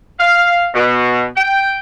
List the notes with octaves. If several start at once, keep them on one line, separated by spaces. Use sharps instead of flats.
F5
B2
G5